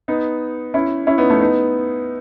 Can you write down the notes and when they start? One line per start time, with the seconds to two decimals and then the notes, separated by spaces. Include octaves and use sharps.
0.08 B3 D#4
0.74 C#4 E4
1.07 C#4 E4
1.18 B3 D#4
1.30 A3 C#4
1.41 B3 D#4